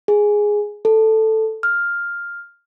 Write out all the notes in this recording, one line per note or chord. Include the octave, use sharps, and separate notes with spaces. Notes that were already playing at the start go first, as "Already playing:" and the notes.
G#4
A4
F6